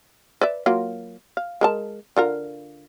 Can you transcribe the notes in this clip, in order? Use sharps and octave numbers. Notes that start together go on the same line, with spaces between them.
B4 D5 E5
F#3 A#3 F4
F5
G#3 A#4 A5
D3 F4 A#4